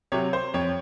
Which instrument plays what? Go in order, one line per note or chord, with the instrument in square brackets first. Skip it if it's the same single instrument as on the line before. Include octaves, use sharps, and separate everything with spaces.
[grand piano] C3 F#3 C#5
C5
F2 C#5